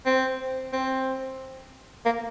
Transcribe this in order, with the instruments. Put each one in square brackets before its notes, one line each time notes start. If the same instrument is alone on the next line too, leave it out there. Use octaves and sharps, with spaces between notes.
[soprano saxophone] C4
C4
A#3